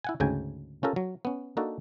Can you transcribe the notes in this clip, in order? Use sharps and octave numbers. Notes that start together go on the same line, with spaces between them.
E4 F#5 G#5
D2 G#2 C#3 G5 G#5
C#4 F4 G4 A4 A#4
F#3
B3 C#4
A#3 D4 D#4 F#4 A4